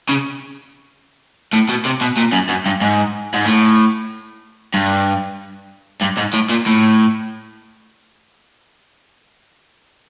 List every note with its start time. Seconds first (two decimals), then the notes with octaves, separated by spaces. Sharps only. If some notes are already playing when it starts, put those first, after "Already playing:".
0.09 C#3
1.53 A2
1.69 B2
1.85 C3
2.01 B2
2.17 A#2
2.33 F#2
2.49 F#2
2.66 G2
2.81 G#2
3.34 G#2
3.46 A2
4.74 G2
6.02 G2
6.18 G#2
6.34 A2
6.50 A#2
6.66 A2